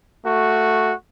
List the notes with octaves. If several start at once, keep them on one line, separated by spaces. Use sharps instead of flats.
A3 F#4